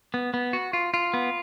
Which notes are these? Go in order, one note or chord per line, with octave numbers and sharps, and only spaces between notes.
B3
B3
F#4
F4
F4
B3